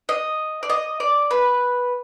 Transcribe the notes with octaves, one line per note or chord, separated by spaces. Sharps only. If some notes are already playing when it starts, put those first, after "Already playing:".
D#5
D5
D#5
D5
B4